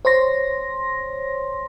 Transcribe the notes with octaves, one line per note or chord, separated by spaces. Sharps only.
C5 C#5 C6 A#6